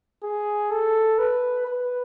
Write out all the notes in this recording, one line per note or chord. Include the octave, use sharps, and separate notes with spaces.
G#4
A4
B4
B4